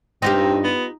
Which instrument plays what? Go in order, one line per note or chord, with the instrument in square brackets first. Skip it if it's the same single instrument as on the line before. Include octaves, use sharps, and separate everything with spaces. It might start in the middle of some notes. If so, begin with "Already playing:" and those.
[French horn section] G2 [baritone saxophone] C4 [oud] D#4 F4 G4
[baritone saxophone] B3